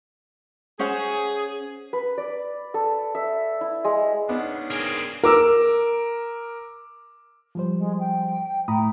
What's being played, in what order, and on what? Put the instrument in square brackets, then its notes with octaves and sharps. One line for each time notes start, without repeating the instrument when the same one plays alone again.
[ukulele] C#4 C5 F#5 [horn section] G#4
[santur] B4
D5
A4
E5
E4
G#3
[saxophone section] G#2 C#3 D4 [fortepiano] B3
[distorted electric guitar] A#3 C4 [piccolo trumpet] G#4
[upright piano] A#4 D6 E6
[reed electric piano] F3 G3 C5
[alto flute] G#3
G5
[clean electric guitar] A2 [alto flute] G5 [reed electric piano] A#5 B5 D#6